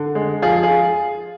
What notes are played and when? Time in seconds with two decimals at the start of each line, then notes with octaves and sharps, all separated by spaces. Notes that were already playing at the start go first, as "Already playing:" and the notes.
Already playing: D3
0.15 G#3
0.42 F3 F4 G#4
0.63 F4 G#4